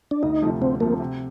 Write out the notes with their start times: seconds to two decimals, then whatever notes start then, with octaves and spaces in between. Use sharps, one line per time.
0.11 D4
0.23 D2 D#4
0.42 C3 F3 A3
0.61 D2 C4
0.80 C3 F3 A3 A#3
1.00 C3